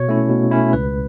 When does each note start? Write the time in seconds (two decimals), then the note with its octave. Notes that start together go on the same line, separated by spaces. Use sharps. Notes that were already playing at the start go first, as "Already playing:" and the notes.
Already playing: B2 C#5
0.09 A3 C#4 E4
0.30 B2
0.51 A3 C#4 E4
0.73 C#2 B4